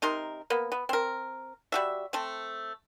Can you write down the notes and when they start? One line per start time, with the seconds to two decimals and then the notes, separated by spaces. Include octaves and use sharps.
0.02 C3 D#4 A#4 C6
0.50 A#3 B3
0.72 B3
0.89 C4 A#4
1.72 G3 F#4 E5
2.13 A3 C4